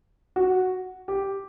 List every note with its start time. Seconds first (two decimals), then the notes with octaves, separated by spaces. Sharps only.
0.36 F#4
1.08 G4